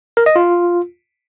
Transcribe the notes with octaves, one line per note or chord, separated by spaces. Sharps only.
A#4
D#5
F4